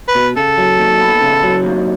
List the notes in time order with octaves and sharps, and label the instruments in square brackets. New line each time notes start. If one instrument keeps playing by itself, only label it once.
[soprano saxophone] B4
[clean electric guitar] B2
[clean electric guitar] C#3 [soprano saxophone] A4
[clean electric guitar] F#3
D#2
B3
C#3
F#3
D#2